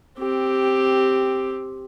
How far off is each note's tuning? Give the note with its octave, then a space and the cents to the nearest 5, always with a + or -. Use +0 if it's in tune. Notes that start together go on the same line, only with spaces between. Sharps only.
C4 +5 G4 +0